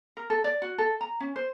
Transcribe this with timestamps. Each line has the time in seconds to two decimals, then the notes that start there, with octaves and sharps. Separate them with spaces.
0.17 A#4
0.30 A4
0.44 D5
0.62 F#4
0.78 A4
1.01 A#5
1.20 C#4
1.36 C5